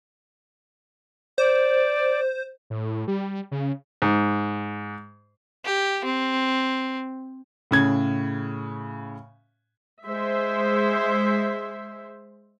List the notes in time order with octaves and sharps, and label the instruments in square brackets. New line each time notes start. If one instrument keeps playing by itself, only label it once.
[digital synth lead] C5 [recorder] D5
[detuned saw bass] A2
G3
C#3
[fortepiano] G#2
[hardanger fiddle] G4
C4
[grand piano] A2 C#3 G#6
[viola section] G#3 C5 E5